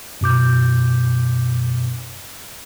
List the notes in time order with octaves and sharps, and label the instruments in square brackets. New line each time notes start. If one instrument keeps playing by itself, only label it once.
[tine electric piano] F#2 B2 D6 G6